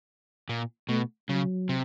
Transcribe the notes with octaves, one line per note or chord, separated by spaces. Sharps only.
A#2 A#3
B2 A3
C#3 F#3
C3